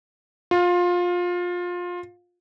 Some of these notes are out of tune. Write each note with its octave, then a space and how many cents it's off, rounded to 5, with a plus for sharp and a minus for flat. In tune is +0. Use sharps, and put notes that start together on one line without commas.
F4 +20